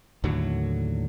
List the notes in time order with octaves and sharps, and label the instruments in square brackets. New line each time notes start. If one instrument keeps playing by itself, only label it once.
[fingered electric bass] D#2 A2 D3 F#3